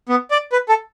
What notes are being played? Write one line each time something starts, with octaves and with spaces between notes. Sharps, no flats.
B3
D5
B4
A4